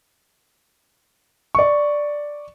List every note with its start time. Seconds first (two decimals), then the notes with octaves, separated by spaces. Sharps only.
1.55 D5 C#6